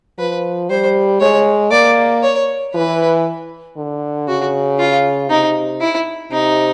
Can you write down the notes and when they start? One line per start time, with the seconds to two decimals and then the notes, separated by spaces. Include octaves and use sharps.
0.18 F3 B4
0.70 G3 C5
1.20 G#3 C#5
1.71 A#3 D5
2.23 C#5
2.74 E3 B4
3.77 D3
4.28 C#3 F#4
4.79 F4
5.30 C3 D#4
5.81 E4
6.31 C3 D#4